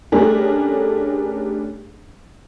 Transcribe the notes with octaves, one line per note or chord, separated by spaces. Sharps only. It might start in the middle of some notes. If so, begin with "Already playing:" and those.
G3 A3 C#4 D4 G#4 A#4